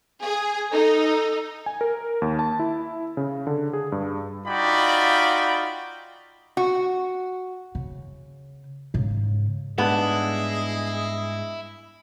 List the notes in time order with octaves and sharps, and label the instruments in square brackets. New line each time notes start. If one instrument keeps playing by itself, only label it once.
[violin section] G#4
[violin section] D#4 [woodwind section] A4
[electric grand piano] G#5
A#4
D#2
A5
E4
C#3
D3
G#4
G2
[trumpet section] D#4 F4 F#4 D5 G5 B5
[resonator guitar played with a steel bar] F#4
[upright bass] C#3
G#2 C#3
[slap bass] G#2 G3 [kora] B3 D4 [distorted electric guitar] E4 [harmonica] G#4 D#5